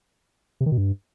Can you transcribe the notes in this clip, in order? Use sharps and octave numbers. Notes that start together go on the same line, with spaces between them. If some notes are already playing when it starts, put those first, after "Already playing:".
C3
D#3
B2
G2